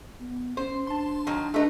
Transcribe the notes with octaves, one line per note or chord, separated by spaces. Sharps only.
B3
C#4 C5
D4 A5 C6
D#3 F#3
A3 D4 D#4 G4 B4